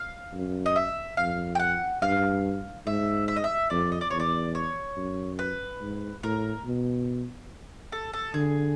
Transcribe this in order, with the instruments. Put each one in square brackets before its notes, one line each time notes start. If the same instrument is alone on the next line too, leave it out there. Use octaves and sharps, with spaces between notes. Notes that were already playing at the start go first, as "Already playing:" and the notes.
Already playing: [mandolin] F5
[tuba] F#2
[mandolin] D#5
E5
[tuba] F2 [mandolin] F5
[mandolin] G5
F#5
[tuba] G2 [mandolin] F5
[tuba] G#2 [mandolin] E5
[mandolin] E5
D#5
E5
[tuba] F2 [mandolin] D5
[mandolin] D#5
D5
[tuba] E2 [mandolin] C#5
[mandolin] D5
C#5
[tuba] F#2
[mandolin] B4
[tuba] G#2
[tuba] A2 [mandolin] A#4
[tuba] B2
[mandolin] A4
A4
[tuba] D3 [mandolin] G#4